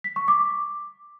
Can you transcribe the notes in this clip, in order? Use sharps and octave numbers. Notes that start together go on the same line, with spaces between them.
B6
C#6
D6